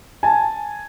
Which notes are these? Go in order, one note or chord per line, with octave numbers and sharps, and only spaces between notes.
G#5 A5